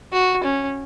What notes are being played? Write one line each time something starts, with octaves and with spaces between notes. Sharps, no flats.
F#4
C#4